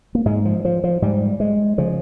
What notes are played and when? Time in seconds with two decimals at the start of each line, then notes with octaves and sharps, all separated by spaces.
0.15 A#3
0.26 G#2 G#3
0.45 F3
0.65 F3
0.84 F3
1.02 G#2 G3
1.40 G#3
1.78 C#3 F3